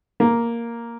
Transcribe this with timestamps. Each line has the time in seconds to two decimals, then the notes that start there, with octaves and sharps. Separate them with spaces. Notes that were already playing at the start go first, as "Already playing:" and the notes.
0.20 A#3